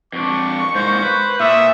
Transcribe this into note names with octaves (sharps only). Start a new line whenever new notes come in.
F2 D4 C#6
G#2 A#3 C5
B4
A#2 E5 C#6 D#6